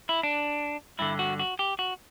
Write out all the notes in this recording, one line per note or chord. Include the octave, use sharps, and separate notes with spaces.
E4
D4
G2 D3 E4
F#4
F#4
G4
F#4